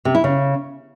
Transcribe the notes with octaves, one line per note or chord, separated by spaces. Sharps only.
C3
E4
C#3